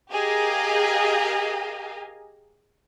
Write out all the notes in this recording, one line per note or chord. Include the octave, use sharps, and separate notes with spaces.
G4 G#4 A#4 D#5 F5